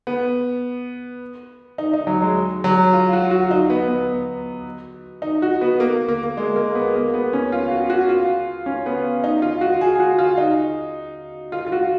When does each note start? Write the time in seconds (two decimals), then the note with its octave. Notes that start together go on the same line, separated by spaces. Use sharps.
0.07 B3
1.78 D#4
1.93 D#4
2.07 F#3
2.22 G#3
2.64 F#3
2.93 F4
3.13 F#4
3.31 F#4
3.51 D#4
3.70 B3
3.88 B3
5.22 D#4
5.42 F#4
5.61 B3
5.80 A#3
6.08 A#3
6.23 A#3
6.37 G#3
6.56 A#3
6.75 B3
6.95 A#3
7.14 B3
7.33 C#4
7.52 F4
7.71 F#4
7.90 F#4
8.09 F4
8.66 C#4
8.86 B3
9.24 D#4
9.42 F4
9.61 F#4
9.81 G#4
9.96 G#4
9.99 F#4
10.19 F4
10.38 D#4
11.52 F4
11.67 F4
11.72 F#4